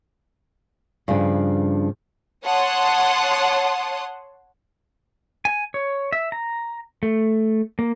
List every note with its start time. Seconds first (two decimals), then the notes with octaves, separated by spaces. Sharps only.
1.08 G2 C#3 F3 D4
2.44 C#5 F#5 A5 C6 D#6
5.45 G#5
5.74 C#5
6.13 E5
6.32 A#5
7.03 A3
7.79 A#3